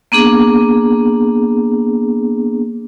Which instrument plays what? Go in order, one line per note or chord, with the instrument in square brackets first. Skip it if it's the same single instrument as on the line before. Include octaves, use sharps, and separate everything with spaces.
[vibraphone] A#3 B3 D4 G#4